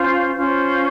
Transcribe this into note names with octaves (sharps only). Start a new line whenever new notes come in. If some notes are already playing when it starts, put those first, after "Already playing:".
Already playing: C#4 F4 C5
C#4 F4 C5